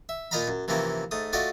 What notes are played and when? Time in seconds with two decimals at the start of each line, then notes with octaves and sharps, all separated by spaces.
0.09 E5
0.31 A#2 F4 D#5 F5 A#5 B5
0.48 F#2
0.68 C3 E3 F3 A#3 C4 C#4
1.11 G#2 A3 D#6
1.33 A3 F4 F#4 D5 D#5